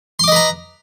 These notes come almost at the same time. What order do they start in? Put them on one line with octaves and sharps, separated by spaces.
C6 D6 D#5 B4 A#5